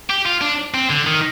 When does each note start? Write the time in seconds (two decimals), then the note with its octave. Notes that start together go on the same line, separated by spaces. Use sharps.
0.10 G4
0.25 F4
0.41 D4
0.74 C4
0.90 D3
1.06 D#3